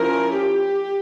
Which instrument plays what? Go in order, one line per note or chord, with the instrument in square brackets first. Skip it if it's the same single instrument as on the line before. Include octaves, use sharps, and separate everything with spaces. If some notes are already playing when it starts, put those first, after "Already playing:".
Already playing: [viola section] F3 C#4 E4 A#4
G4